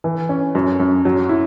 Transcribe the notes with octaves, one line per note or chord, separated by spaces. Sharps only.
E3
C#4
F#2
F#2
F#3
E4